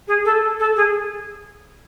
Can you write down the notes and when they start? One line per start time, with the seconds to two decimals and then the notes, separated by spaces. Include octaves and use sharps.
0.08 G#4
0.25 A4
0.59 A4
0.76 G#4